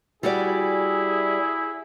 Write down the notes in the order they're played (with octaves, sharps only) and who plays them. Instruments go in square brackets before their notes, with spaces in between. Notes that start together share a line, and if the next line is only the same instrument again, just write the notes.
[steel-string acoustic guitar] G3 F#4 D5 [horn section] E4 G#4